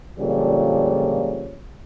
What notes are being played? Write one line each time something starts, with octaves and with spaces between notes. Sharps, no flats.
A#2 D3 F3 G3 G#3 C#4